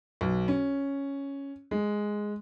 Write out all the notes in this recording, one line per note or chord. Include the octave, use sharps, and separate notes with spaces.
B1
C#4
G#3